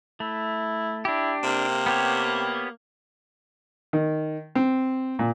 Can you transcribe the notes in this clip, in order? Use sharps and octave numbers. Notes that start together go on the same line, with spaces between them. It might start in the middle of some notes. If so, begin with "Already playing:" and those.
A3 E4
D4 E4 G4
C3 A#3
B3 G4 C#5
D#3
C4
A#2